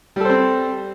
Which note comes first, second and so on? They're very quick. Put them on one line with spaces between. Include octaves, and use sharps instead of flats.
G3 A4 C5 C4